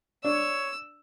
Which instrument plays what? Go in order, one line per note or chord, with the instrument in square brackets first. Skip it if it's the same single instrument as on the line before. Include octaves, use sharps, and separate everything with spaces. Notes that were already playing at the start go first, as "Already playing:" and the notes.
[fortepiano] D4 [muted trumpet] C#5 [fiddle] E6